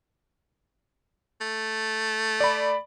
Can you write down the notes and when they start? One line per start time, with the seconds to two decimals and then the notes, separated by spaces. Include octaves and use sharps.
1.41 A3
2.40 D5 B5